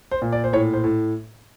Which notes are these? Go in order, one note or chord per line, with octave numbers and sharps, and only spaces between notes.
C5
A#2
D5
C5
A2 C#5
C5
A2